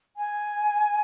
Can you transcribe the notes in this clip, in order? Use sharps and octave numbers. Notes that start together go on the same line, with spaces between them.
G#5